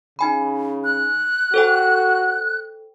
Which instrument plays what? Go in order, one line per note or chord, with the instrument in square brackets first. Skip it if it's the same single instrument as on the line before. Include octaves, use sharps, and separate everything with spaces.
[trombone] C#3 [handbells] D#4 G#5 B5
[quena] F#6
[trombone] F#4 [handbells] A4 C5 G5